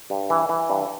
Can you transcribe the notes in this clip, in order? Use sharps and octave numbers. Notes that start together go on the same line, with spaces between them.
G2
E3
E3
G2